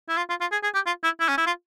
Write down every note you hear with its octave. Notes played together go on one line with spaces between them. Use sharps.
E4
F4
F4
F4
G#4
G#4
G4
F4
E4
E4
C#4
E4
F4